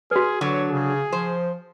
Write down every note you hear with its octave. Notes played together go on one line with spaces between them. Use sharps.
F#4 G#4 B4
D3 F#3 C#5
C#3 G#4
F3 C5